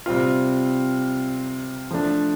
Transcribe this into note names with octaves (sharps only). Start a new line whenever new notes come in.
C3 G3 C4 F4
F3 A3 D4